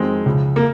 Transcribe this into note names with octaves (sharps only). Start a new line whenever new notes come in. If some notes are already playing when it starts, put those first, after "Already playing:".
Already playing: F2 D#3 F#3 G#3 C4
C#2 C#3 F3
A#3